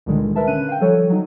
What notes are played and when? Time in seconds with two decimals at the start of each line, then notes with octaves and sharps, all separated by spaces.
0.06 C#2 A#2 D3 D#3 G3 G#3
0.36 A#4 B4 E5 A5
0.47 D3 C#4 F#6 D#7
0.69 F5 G5
0.80 F3 G3 A4 C#5
1.09 F#3 D#4